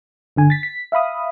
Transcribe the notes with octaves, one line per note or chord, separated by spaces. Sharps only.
G1 D3 G#5
A6 B6
B6
E5 F5 B5 D#6